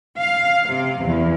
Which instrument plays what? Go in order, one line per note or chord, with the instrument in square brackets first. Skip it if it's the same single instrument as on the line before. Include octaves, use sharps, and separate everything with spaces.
[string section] F5
C3
E2